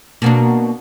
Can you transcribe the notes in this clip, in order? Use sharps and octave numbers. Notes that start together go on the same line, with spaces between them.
B2 A#3 D4